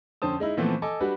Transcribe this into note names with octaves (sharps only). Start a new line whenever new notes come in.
F2 D3 C#4 C5 A5 D#6
G#3 D#4 E4
A#2 E3 F3 A3 B3 C4
A4 D#5 G#5 D6
G3 D4 F#4 G4 B4